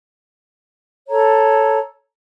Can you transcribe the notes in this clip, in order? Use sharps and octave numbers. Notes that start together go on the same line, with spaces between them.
A4 C#5 A#5